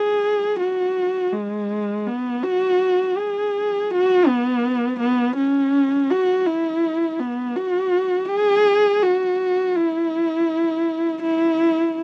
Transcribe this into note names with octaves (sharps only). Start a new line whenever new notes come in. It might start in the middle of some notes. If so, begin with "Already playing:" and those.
Already playing: G#4
F#4
G#3
B3
F#4
G#4
F#4
B3
B3
C#4
F#4
E4
B3
F#4
G#4
F#4
E4
E4